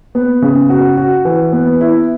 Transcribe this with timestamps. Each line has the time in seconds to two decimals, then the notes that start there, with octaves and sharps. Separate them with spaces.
0.15 B3
0.42 C#3
0.70 F#4
0.97 F#4
1.25 E3
1.53 B3
1.81 E4